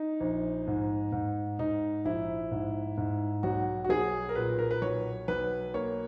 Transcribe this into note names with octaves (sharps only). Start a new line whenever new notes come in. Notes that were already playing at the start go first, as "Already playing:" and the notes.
Already playing: D#4
A#1
G#2
G#2
G#2 D#4
A#1 E4
G#2
G#2
B1 F#4
F#4
B1 G#4
A#4
A#2 B4
A#4
B4
B1 C#5
B1 B4
A#3 C#5